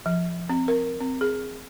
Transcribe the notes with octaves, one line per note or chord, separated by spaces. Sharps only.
F3
C4
A#4
C4
G#4